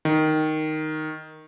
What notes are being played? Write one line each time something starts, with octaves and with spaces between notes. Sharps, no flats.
D#3